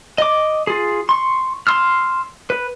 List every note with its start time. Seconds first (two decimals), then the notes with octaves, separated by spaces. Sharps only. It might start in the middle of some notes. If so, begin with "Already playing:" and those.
0.18 D#5 D6
0.67 F4 G#4
1.09 C6 C#6
1.67 C6 E6 F6
2.50 B4